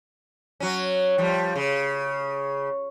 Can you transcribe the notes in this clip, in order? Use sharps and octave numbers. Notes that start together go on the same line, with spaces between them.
F#3 C#4
F3 G3
C#3